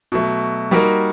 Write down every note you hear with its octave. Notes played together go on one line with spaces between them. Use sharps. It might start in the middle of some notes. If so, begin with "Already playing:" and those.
B2 F#3 A3
G3 A#3 D#4 F#4 A#4